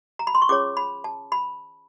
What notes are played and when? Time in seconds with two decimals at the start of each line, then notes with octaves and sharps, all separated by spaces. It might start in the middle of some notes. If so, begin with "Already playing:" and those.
0.19 A#5
0.27 B5
0.35 C6
0.42 C#6
0.49 C#4 F4 G#4 C#5 D6
0.77 B5
1.04 A5
1.32 B5